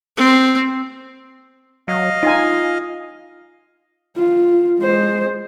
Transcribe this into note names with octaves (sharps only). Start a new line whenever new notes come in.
C4
F#3 D#5 F5
D#4 F4 G#5
F4
G#3 C5